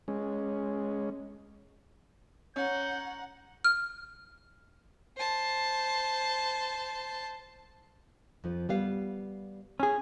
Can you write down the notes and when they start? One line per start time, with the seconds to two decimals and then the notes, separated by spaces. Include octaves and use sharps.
0.08 G#3 C#4
2.56 C#4 F#5 A#5 G6
3.65 F6
5.17 C5 A5
8.44 F2 F3
8.69 G3 B3 F5
9.80 C#4 G#4